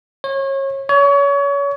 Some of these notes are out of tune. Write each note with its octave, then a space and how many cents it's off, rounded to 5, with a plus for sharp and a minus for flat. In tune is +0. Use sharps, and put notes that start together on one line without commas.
C#5 -30
C#5 +30